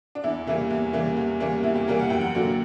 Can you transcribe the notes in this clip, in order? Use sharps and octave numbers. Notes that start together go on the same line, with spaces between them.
D4
E2 E4
C#3 E3 G3 A#3 E4
E2
C#3 E3 G3 A#3
E2
C#3 E3 G3 A#3
E2 E4
G4
C#3 E3 G3 A#3 A#4
F#5
F#2 G5
F#5
D3 F#3 A#3